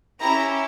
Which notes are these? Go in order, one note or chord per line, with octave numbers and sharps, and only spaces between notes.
C#4 E4 G4 A#5